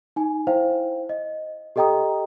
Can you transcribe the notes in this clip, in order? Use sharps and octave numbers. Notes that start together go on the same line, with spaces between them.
D#4 G#5
E4 C5 F5 G5
D#5
G4 A4 D#5 G5 A#5 D#6